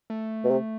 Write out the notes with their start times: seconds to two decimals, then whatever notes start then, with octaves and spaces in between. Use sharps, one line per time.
0.10 A3
0.44 B2
0.51 C3